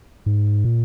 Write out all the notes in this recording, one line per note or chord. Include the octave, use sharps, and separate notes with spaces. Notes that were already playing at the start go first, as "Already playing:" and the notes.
G#2
A#2